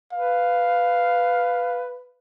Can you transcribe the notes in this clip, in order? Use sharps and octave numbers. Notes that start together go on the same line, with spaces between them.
B4 F5